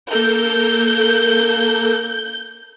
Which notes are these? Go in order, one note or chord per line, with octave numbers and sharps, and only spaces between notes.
A#3 A4 A#4 G6